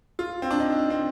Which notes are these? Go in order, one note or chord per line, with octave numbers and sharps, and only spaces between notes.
F4
C4
D4
D#4
C4